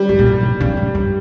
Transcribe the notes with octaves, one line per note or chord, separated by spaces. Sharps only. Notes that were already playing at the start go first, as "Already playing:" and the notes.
Already playing: G3
G#2
A#2
A2
B2
C#3
G#2
G2